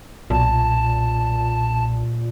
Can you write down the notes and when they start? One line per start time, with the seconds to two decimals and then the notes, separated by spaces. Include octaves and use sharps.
0.30 B1 A#2 A5